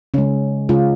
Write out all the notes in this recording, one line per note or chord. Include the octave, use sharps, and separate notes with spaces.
C#3 G#3 C#4
C#3 G#3 C#4 F4